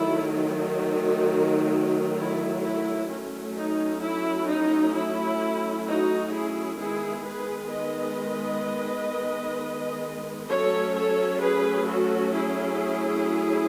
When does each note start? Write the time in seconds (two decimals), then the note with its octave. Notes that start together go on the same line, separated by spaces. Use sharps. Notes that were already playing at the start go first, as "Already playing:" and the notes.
Already playing: D#3 F#3 A3 E4
0.32 D#4 F#4
2.17 E4
2.63 E4
3.09 F#3 A3 C#4
3.56 D#4
4.02 E4
4.48 D#4
4.94 E4
5.86 D#4 F#4
6.33 E4 G#4
6.79 D#3 G#3 B3 E4 G#4
7.25 G#4 B4
7.71 B4 D#5
10.48 F#3 A3 C#4 A4 C#5
10.95 A4 C#5
11.41 G#4 B4
11.87 F#4 A4
12.33 E4 G#4